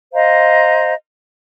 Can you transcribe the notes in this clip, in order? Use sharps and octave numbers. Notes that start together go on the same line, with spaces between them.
C5 D#5 F5 A#5